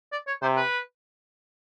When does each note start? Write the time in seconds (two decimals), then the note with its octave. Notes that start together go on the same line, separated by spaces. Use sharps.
0.12 D5
0.27 C#5
0.42 C3 C5
0.56 B4